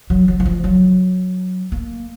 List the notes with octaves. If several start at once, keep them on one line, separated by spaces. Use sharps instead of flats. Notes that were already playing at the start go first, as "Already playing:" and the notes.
F#3
F#3
E3
F3
F#3
A#3